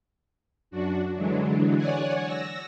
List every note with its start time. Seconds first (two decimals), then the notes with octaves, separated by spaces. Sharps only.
0.71 F#2 D4 F#4
1.16 D3 E3 F#3 G#3 D4
1.76 C#5 D5 F#5 G#5
2.25 E6 A#6